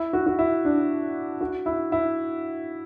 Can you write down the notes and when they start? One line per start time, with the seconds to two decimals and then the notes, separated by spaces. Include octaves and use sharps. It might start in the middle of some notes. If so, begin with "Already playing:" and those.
Already playing: E4
0.13 F#4
0.27 F#4
0.39 E4
0.65 D4
1.41 F#4
1.66 E4
1.92 E4